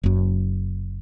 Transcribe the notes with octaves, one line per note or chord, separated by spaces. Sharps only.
F#1 F#2